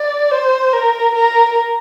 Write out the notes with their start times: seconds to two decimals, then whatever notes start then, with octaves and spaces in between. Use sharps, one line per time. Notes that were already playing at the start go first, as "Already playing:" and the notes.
Already playing: D5
0.31 C5
0.73 A#4
1.15 A#4